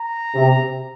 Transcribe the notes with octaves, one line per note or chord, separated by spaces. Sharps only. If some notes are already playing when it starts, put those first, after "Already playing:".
Already playing: A#5
C3